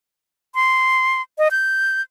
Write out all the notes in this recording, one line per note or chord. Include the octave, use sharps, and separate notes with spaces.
C6
D#5
G6